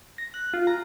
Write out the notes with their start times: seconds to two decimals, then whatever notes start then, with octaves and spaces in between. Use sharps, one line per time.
0.18 A#6
0.34 F#6
0.54 F4
0.67 A#5